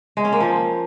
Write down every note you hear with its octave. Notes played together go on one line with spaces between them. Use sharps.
G#3
C#4
A#3
F3